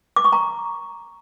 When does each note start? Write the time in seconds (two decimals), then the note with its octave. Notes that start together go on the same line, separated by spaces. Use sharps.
0.16 D6
0.24 C#6
0.32 A#5